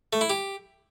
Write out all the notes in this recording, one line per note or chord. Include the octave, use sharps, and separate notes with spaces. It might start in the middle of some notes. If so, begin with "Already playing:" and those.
A3
E4
G4